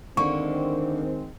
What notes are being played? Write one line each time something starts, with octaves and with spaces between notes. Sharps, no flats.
D3 D#3 G#3 A#3 C4 D4 C#6